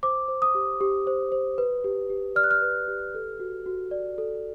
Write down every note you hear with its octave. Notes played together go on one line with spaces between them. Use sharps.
C5 D6
C5
D#6
G4
G4
C5
C5
B4
G4
G4
D5 F6
F#6
F6
B4
G4
A4
F#4
F#4
D5
A4